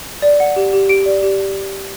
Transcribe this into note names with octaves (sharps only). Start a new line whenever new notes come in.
D5
F#5
G4
G4
G4 D7
D5
G4